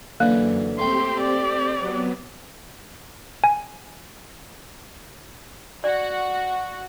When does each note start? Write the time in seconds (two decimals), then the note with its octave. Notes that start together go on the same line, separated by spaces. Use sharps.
0.20 F#2 D3 E3 A#3
0.79 A3 C4 G4 G5 C6
1.20 D5
1.79 F#3 B3
3.44 G#5
5.84 F#4 D5